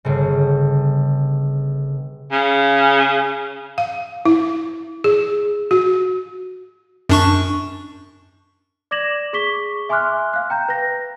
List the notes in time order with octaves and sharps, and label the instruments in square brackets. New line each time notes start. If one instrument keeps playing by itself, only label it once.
[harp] G1 C#3
[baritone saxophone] C#3
[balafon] F5
E4
G#4
F#4
[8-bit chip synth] F#2 D4 C#6
[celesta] D5 D6 G#6 A#6 E7 F#7
G#4 C#6 D6 B6 G7
E5 G#5 C6 D6 F6 F#6
F5 F#6
G5 A#5 G6
B4 A#6